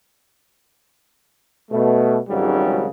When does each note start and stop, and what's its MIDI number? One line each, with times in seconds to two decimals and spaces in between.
1.71 2.17 47
1.71 2.17 57
2.28 2.86 32
2.28 2.86 37
2.28 2.86 44
2.28 2.86 49
2.28 2.86 54
2.28 2.86 55